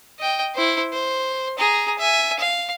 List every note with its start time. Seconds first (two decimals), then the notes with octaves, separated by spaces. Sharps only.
0.19 D#5 G5
0.55 E4 C5
0.92 C5
1.58 G#4 A#5
1.98 E5 G#5
2.39 F5